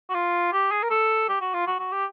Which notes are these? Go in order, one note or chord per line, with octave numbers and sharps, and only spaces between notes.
F#4
F4
G4
G#4
A#4
A4
G4
F#4
F4
F#4
F#4
G4